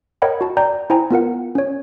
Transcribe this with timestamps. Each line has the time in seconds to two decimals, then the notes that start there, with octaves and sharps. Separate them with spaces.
0.22 A#4 C#5 D#5 F#5 G5 B5
0.41 F#4 A5
0.57 D5 G5 A#5 G6
0.90 E4 C5 G5 G#5 A#5
1.11 B3 F4 A#4 F#5
1.55 C#4 C#5